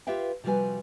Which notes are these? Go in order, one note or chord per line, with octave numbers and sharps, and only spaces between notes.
F4 G4 B4 E5 F5 G5
C3 F3 G3 F#4 B4 G#5